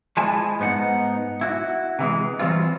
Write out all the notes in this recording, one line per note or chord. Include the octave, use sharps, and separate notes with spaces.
F3 G#3 E4 G#5 A5
G#2 B3 D#4 F#5
E4 F#4
C3 E3 G#3
E3 F#3 G3 C4 F4